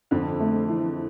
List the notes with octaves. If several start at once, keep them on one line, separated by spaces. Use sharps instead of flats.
F2 D3
A3
E3